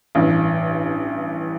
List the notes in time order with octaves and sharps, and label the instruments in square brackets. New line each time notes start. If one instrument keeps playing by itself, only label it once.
[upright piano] A1 G2 E3